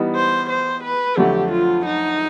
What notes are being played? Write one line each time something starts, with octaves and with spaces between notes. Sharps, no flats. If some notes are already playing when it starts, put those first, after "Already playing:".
Already playing: E3 G3 B3 D#4
C5
C5
B4
F2 D3 F#3 A3 G4
F4
D#4